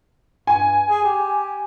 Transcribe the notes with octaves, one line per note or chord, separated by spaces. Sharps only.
G2 G#5
G#4
G4